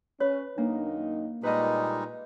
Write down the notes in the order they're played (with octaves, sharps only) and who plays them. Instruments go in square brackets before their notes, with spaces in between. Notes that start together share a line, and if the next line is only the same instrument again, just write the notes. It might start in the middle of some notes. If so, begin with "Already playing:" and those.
[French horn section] C#4 [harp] B4 [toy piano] C#5
[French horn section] F#2 D#3 D#4 [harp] A#3 [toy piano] D4
[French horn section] A#2 [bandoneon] G3 G#3 D#4 [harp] B4 D#5